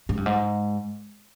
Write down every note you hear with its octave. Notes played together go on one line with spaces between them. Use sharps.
G#2
G2
G#2